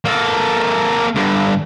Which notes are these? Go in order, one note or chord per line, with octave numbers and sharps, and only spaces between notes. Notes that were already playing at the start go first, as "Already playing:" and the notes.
A#3 A4
G2 D3